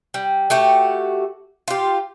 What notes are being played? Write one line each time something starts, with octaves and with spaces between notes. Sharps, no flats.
G3
A3 F#4 G4
F4 G4